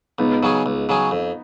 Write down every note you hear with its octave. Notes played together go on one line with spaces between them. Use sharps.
C#2 B3 D#4
C#3 F#3 C#4 G#4
C#2
C#3 F#3 C#4 G#4
F2